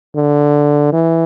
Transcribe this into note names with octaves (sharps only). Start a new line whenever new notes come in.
D3
E3